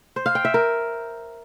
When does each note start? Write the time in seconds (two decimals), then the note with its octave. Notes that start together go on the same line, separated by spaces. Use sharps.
0.16 C5
0.26 F5
0.35 G5
0.45 E5
0.54 A#4